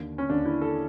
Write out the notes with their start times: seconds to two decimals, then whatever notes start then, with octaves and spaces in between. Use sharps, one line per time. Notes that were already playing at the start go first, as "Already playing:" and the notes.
Already playing: D#2 D3
0.18 C#4
0.30 D#2 D3 D4
0.46 E4
0.62 A4